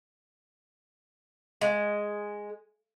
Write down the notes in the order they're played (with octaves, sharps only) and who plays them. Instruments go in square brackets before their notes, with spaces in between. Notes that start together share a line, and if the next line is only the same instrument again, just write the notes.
[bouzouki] G#3